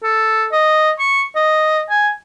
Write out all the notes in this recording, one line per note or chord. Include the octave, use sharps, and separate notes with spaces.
A4
D#5
C#6
D#5
G#5